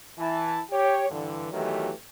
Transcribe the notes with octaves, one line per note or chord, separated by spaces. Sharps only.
E3 E4 A5
G4 C#5
G2 D3 E3
E2 D#3 E3 F#3 A3 G4